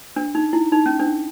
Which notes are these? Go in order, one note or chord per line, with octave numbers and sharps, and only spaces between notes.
D4
D#4
E4
D#4
C#4
D4